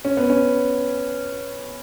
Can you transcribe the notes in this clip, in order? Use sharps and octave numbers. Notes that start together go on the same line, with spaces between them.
C#4
B3
C#4